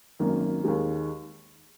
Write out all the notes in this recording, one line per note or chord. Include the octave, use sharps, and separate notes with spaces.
G#1 F#2 D#3 A#3
D#2 D#3 G#3